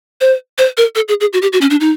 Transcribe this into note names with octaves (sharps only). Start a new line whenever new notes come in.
C5
C5
A#4
A4
G#4
G#4
F#4
G4
F#4
C#4
D4
D#4